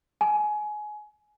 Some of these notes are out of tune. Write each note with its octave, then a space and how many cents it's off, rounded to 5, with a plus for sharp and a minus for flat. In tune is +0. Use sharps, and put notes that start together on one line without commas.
G#5 +20